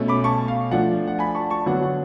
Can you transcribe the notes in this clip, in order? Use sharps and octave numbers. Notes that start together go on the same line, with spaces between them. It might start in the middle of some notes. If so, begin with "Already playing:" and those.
Already playing: B2 A3 C#4
B5 D6
A5 C#6
F5
F3 A3 D4 F#5
F#5
G#5 B5
A5 C#6
A5 C#6
D3 F#3 B3 D4 F#5
F#5